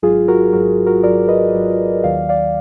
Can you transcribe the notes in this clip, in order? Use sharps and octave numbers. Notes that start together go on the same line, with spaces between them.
G#1 G#2 F#3 F4 G#4
F#4 A#4
G#1 G#2 F#3 F#4 A#4
F#4 A#4
G#1 G#2 F#3 A#4 D5
B4 D#5
G#1 G#2 F#3
D#2 D#3 F#3 D5 F5
D5 F5